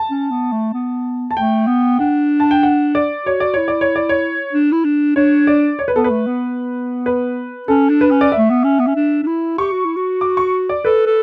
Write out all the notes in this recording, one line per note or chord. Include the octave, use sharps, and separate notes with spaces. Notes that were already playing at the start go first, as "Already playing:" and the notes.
Already playing: A5
C#4
B3
A3
B3
A5
A3 G5
B3
D4 F#5
A5
G5
F#5
D5
F#4 C#5
D5
E4 C#5
D5
C#5
D5
C#5
D4
E4
D4
D4 C#5
D5
C#5
B4
B3 A4
B4
A3
B3
B4
C#4 A4
D4
B4
C#4
D5
A3 E5
B3
C#4
B3
C#4
D4
D4
E4
G4 C#6
F#4
E4
F#4
D6
C#6
D5
A4 B4
A4